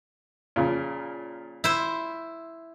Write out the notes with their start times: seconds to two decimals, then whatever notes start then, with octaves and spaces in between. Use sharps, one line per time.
0.56 A#2 C#3 F3
1.64 E4 C5